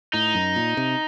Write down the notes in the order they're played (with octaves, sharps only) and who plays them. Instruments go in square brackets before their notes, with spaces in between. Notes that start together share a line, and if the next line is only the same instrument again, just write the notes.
[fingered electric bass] A2 [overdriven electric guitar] D#4
[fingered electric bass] F#2
A#2
C3